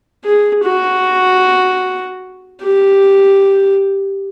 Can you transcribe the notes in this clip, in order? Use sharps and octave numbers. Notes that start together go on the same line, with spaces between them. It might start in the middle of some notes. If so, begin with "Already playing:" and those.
G#4
F#4
G4